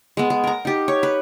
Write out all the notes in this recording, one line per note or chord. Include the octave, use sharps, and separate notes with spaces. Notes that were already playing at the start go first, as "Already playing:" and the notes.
G#3 B3
G#3
A#4 A#5
D#4 G4
C#5
B4